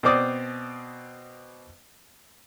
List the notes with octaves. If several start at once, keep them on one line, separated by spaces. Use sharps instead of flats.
B2 C4 C5 D5 D6 D#6